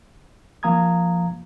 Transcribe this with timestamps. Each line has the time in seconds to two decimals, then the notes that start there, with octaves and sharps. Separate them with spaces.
0.63 F3 A#3 F5 A#5 D#6 G#6